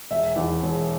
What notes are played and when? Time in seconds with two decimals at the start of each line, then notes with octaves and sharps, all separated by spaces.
0.11 E1 E5
0.36 E2 E3
0.63 E1